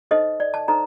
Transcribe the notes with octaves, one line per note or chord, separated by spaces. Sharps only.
D#4 A4 C5 D#5
D5
A5
D#4 A4 C5 A#5